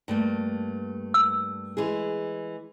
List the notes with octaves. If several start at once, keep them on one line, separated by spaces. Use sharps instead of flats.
G2 A3 A#3
E6
E3 G#3 G#4